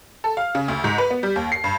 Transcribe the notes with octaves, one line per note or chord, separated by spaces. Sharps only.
A4
F5
C#3
D2
G#2
B4
B3
G3
D#2
C7
G2